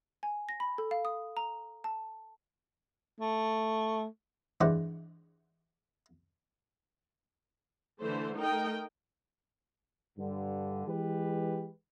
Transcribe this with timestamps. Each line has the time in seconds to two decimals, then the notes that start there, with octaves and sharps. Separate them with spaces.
0.23 G#5
0.49 A#6
0.60 B5
0.78 A4
0.91 F5
1.05 D#6
1.37 A#5
1.84 A5
3.21 A3
4.61 G2 E3 G#3 C5 D5 F#5
8.00 D3 E3 A3 C5
8.37 A3 D#4 A#4 D#5 G5
10.18 G2 D3
10.87 E3 G#3 G4 B4